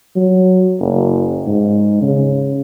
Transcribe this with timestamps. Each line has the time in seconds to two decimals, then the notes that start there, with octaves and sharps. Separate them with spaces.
0.16 F#3
0.80 F#1
1.47 G#2
2.02 C#3